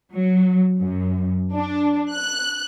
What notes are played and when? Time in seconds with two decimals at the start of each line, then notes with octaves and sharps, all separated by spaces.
0.13 F#3
0.80 F#2
1.55 D4
2.11 F#6